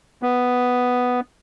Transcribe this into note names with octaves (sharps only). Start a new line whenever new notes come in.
B3